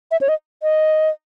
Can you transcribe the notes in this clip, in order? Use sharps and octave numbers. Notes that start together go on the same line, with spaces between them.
E5
C#5
D#5
D#5